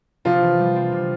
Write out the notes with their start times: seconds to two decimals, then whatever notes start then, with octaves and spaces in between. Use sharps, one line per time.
0.25 C3 F3 F4
0.42 E3
0.59 G3
0.76 C4
0.92 C3